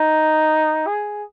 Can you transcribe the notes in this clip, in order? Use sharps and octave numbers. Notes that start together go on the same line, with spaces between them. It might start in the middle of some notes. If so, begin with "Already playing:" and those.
Already playing: D#4
G#4